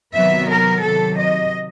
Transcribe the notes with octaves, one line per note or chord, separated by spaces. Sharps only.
C3 D#3 F#3 B3 E5
A#4
C3 D#3 F#3 A4
D#5